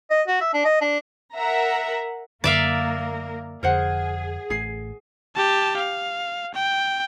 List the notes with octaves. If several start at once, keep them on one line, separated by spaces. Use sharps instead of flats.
D#5
F#4
E5
D4
D#5
D4
A#4 E5 F#5 A#5
F#2 D3 A#3 A#4 D5 E5 F5
F1 F2 D3 G#4 A#4 C5 F#5
A1 A2 G#4 C7
G4 A5
F5
G5